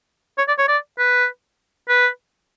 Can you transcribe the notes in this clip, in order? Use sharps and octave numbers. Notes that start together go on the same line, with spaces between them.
C#5
D5
C#5
D5
B4
B4